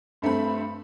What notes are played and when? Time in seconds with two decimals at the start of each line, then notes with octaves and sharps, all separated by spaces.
0.22 G2 A3 C4 B5